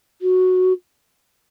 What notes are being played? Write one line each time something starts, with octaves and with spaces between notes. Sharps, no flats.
F#4